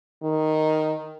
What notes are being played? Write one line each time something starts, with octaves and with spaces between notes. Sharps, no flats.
D#3